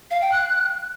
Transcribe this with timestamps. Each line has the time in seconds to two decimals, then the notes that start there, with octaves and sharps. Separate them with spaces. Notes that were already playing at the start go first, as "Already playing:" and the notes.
0.11 F5
0.21 G5
0.32 F#6